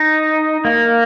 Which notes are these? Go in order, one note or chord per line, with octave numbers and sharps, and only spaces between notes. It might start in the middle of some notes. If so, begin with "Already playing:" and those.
Already playing: D#4
A#3